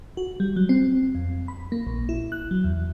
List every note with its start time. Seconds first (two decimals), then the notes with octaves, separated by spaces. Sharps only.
0.17 F#4
0.40 G3
0.56 F#3
0.69 C4
1.15 F2
1.48 B5
1.72 A#3
1.87 A#1
2.09 E4
2.32 F#6
2.51 F#3
2.64 E2